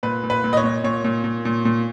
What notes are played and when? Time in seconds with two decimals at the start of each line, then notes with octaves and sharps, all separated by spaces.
0.03 A#2 B4
0.23 A#2
0.30 B4
0.44 A#2
0.53 D#5
0.57 C#5
0.64 A#2
0.84 A#2 C#5
1.04 A#2
1.24 A#2
1.45 A#2
1.65 A#2